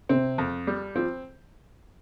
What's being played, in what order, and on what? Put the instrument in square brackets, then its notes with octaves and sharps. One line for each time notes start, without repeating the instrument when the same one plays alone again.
[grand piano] C3 [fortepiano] C4
[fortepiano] F2
G3
[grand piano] F3 [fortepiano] C4